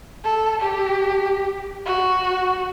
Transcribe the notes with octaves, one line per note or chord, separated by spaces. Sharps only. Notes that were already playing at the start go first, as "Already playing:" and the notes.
A4
G4
F#4